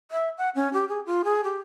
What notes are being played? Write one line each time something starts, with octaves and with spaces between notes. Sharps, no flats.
E5
F#5
C#4
G4
G#4
F4
G#4
G4